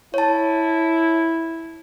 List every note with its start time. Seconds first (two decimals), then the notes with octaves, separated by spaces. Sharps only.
0.14 E4 C#5 A5